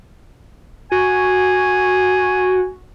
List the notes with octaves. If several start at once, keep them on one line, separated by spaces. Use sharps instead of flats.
F#4 G#5